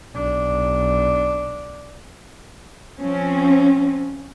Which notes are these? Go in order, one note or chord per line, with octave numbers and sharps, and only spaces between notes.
B1 D4
F3 C4 C#4